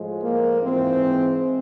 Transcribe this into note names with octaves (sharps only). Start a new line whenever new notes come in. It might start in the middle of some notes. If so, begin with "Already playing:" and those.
Already playing: A2 F3 G#3
A#3
G#2 E3 G#3 C4